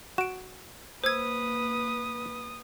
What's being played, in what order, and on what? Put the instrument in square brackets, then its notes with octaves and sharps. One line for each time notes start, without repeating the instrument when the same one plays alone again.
[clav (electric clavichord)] F#4 [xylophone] D7 E7
[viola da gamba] A#3 B4 [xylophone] C5 E6 G#6 [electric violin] D#6